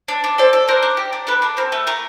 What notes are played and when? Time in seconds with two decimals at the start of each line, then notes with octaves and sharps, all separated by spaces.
0.08 D4
0.24 D4
0.38 A4 C5 D5
0.53 A4
0.68 D4 A#4 C5
0.83 D4
0.97 G4
1.13 D4
1.27 D4 A4 B4
1.42 D4 A#4
1.57 C4 A#4
1.72 A3 A4
1.87 A3 A#4